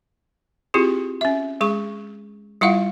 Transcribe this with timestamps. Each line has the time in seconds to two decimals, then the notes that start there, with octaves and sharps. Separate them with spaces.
0.74 C4 E4 F4 G4 G#4
1.21 C#4 E5
1.61 G#3 G#4 C#6
2.61 G3 E4 F4 F5 F#5